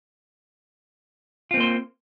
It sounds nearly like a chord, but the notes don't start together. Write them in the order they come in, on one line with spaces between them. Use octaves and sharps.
F4 C4 A#3 C5